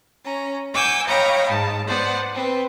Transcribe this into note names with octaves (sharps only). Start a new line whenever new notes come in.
C#4 A#5
F#5 G#5 D6 E6 G6
C#5 D#5 F5 G5 A#5 B5
G#2 A5
B3 C5 D5 F#5
C4 B4